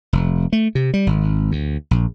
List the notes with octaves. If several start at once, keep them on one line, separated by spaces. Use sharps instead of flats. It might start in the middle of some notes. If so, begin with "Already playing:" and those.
F1
A3
C3
G3
G#1
D2
A#1